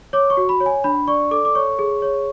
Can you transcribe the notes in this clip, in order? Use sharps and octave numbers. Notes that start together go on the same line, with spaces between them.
C#5 D6
C#6
F#4
B5
C#5
G#5
D4 B5
D5 C#6
A4 D6
D6
C#5 C#6
G#4
C#5